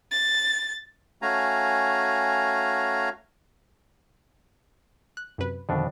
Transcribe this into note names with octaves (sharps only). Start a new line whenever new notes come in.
A6
A3 C#4 F#4 F5 G#5 A#5
F#6
F#2 C3 B4
F2 B2 D3 D#3 D4